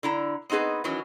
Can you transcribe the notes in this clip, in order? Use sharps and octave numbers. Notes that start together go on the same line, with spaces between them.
D3 E4 A#5
B3 C4 D#4 G#4 B4
D#3 E3 F#3 C#4